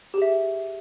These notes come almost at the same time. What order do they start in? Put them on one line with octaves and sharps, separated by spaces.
G4 G#4 E5